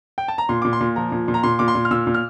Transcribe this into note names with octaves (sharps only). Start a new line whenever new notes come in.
G5
A5
A#5
A#2 C6
A#2 D6
C6
A#2
F3 A#5
A#2
A#2
A#5
A#2 C6
A#2 D6
C6
A#2
F6
A#2 E6
A#2
F6